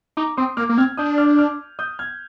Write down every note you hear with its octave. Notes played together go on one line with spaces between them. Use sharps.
D#4 A#5 D6
C4 C6 D#6
A#3 D6 F6
A#3
C4 F6 G#6
D4 D#6 G6
D6 F6
D6 F6
D#6 G6
F6 G#6